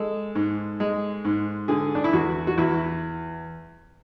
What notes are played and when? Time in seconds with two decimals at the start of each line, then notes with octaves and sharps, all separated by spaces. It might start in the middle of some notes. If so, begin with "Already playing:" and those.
Already playing: G#3 A4
0.35 G#2
0.80 G#3
1.25 G#2
1.68 D3 G#4
1.95 D4
2.04 E4
2.13 E2 F#4
2.47 F#4
2.58 E2 E4